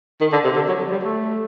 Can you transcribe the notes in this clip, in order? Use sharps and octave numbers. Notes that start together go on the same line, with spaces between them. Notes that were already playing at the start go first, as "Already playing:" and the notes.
D#3
D3
C3
D3
F#3
F#3
G3
A3